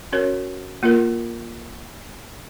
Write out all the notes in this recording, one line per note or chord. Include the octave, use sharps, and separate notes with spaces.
C#4 F#4 A#4 C#5
A#3 F4 A#4